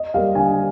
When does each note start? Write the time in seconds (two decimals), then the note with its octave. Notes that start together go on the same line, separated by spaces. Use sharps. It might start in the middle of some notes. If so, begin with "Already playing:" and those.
Already playing: D#5
0.14 G3 A#3 F5
0.35 D3 G#5